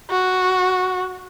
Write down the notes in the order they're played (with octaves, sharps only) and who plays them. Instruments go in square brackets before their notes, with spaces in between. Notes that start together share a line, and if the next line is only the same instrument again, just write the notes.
[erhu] F#4